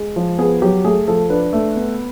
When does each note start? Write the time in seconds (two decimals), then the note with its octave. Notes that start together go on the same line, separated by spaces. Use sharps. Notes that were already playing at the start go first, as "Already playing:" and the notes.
Already playing: G#3
0.16 F3
0.38 B3 G#4
0.62 F#3 G4
0.84 A3 G#4
1.08 F3 A4
1.30 D4 B4
1.53 A3
1.76 B3